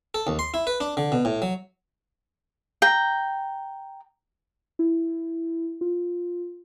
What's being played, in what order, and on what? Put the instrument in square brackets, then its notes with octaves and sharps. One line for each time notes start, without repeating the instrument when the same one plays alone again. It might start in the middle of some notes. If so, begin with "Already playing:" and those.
[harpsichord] A4
D#2
C6
E4
B4
D4
D3
B2
A2
F#3
[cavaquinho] G5 A#5
[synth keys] E4
F4